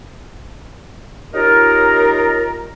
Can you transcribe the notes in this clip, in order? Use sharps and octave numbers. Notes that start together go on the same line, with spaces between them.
C#4 D#4 F4 G4 A#4